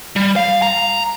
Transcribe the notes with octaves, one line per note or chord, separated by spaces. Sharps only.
G3
F5
A#5